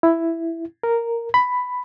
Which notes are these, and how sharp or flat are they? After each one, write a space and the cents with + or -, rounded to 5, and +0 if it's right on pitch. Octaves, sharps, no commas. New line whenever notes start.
E4 +5
A#4 -5
B5 +10